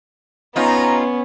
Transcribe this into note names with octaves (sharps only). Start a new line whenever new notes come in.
B3 C#4 D#4 F4 A#5